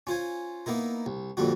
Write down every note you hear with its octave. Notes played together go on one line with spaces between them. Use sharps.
C#4 F4 C5 G#5
A#3 B3 D#4 E4 A#4
C2
F2 A#2 D3 G3 F#4